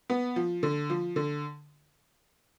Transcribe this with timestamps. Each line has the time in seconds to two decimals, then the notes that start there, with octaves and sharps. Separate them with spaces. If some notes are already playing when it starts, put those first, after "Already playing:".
0.10 B3
0.36 F3
0.63 D3
0.90 F3
1.16 D3